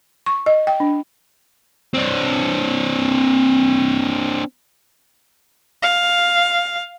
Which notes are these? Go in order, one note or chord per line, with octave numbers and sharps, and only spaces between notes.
C#6
D#5
G5
D4
C4 D4
F5